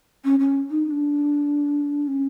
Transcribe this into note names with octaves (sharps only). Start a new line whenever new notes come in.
C#4
C#4
D#4
D#4
D4
C#4